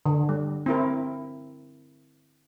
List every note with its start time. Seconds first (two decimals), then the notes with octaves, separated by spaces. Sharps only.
0.06 D3
0.29 G3
0.66 C4 E4 A#4